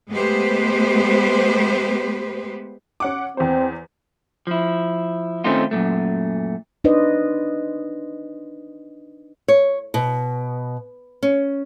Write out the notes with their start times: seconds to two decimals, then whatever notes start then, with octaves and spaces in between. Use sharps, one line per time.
0.11 G#3 A3 B3 G4 B4 C5
3.00 C#4 F#5 D6
3.37 E2 C4 C5
4.47 F3 E4
5.44 D#3 A3 C4 C#4 D#4 F4
5.71 F#2 A#2 A3
6.84 D4 D#4 B4 C5 D5 D#5
9.48 C#5
9.94 B2
11.23 C#4